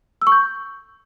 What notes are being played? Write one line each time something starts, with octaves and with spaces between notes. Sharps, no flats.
E6
C#6
G6